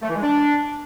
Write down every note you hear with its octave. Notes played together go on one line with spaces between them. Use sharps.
A3
E3
G#3
D4